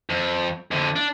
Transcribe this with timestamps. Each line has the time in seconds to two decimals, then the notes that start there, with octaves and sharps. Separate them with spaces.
0.10 F2
0.71 F2 D3
0.96 D4